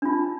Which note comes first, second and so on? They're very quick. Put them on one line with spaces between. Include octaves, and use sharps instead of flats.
D4 F4 D#4